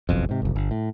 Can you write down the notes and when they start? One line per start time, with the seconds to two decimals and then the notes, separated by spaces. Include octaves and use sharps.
0.09 F#1 B1 F2
0.29 G#2 C3
0.42 F#1 C2
0.56 G1
0.71 A2